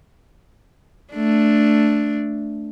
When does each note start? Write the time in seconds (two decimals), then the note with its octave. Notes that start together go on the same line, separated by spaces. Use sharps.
1.13 A3 D4